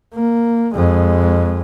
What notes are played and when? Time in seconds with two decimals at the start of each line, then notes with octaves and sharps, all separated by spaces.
0.14 A#3
0.75 F2 G#3